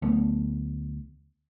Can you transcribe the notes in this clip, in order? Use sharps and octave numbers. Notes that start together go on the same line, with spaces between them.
D2 F#3 A3 B3